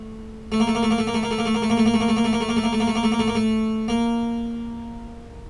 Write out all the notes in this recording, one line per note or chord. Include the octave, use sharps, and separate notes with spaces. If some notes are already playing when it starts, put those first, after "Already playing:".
Already playing: A3
A3
A#3
A3
A#3
A3
A#3
A3
A#3
A3
A#3
A3
A#3
A3
A#3
A3
A#3
A3
A#3
A3
A#3
A3
A#3
A3
A#3
A3
A#3
A3
A#3
A3
A#3
A3
A#3
A3
A#3
A3
A#3
A3
A#3